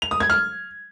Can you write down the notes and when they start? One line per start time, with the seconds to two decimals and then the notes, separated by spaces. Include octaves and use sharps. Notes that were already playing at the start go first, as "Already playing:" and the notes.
0.02 F7
0.11 D#6
0.20 G#6
0.30 F6